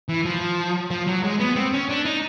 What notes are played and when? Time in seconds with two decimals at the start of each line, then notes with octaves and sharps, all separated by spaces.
0.09 E3
0.25 F3
0.91 F3
1.07 F#3
1.24 G#3
1.40 B3
1.56 C4
1.73 C#4
1.90 D4
2.05 D#4